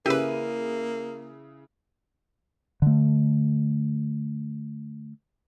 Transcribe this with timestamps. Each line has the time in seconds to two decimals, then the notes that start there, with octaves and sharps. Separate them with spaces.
0.06 C#3 A#3 E4 G4 G#4 B4 E6 D#7
2.82 D3 A3